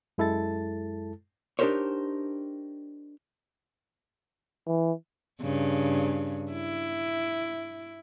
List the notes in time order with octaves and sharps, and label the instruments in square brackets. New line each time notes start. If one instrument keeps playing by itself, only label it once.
[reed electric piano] F#2 G#3 E4 A4 A5 A6
[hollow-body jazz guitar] D4 D#4 G4 A#4 C5 C#5
[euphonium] E3
[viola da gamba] G2 C#3
E4